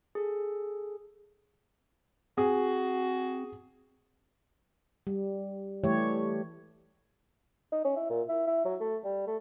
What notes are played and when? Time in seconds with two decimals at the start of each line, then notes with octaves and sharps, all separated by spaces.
0.15 G#4 A4
2.38 C4 F#4 G#4
5.07 G3
5.84 E3 G3 A3 G4 C#5
7.72 D#4
7.85 C#4
7.97 E4
8.10 A#2
8.29 E4
8.47 E4
8.65 F#3
8.80 A3
9.04 G3
9.27 A3